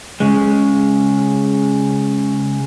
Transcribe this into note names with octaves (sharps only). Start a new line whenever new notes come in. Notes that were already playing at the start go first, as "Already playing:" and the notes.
C#3 G#3